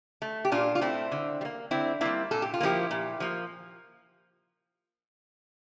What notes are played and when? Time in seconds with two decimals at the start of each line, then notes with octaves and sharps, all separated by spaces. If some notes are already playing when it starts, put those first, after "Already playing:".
0.22 A3
0.45 G4
0.52 A#2 D4 F4
0.75 F4
0.81 A3 C4 E4
1.12 D3
1.41 G3
1.45 A#3
1.71 D3 C4 E4
2.01 G3 A#3 C4 E4
2.31 A#2 A4
2.42 G4
2.54 F4
2.60 F3 A#3 E4 G4
2.91 A#2
3.20 F3 A#3